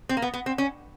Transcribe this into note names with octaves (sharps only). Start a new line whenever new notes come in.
C4
A#3
B3
B3
C4
C#4